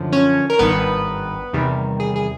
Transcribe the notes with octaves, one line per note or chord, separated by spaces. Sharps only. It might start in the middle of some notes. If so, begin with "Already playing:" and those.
Already playing: F#2 D3 F3
C#4 C#5
A#4
G#1 G2 D#3 B3 B4
E2 C3 D#3 G3
G#4
G#4